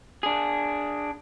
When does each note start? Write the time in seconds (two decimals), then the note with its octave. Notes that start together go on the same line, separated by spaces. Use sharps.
0.23 D4 G#4